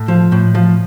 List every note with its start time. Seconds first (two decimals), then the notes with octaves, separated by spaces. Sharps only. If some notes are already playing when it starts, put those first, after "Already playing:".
Already playing: A2
0.08 F3
0.32 A2
0.55 F3